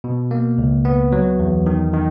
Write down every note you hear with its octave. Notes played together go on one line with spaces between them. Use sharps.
B2
A#3
C#2
B3
F#3
E2
D#3
D#3